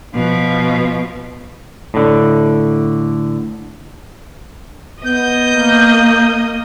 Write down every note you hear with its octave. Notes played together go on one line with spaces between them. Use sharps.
B2 F3
A2 D3
B3 D#5 G6
A#3